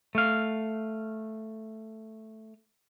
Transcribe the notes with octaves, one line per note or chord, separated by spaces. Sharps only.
A3 F5